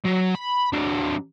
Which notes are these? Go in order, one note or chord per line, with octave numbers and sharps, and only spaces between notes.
F#3
B5
F#3 D4